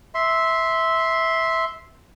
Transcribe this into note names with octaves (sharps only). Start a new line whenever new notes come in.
E5 C6